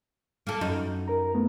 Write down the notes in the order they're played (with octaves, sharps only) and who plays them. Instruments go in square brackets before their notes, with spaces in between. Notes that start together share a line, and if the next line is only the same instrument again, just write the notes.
[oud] A#3 A4
F#2 D#4
[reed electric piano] A#4 A#5
A3 B3